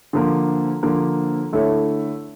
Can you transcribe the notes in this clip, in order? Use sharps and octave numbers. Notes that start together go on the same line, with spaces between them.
D3 F3 A#3
D3 F3 A#3
D3 A3 E4 A4 C#5